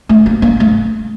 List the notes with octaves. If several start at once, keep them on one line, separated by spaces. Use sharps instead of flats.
A3
A#3
A#3
A3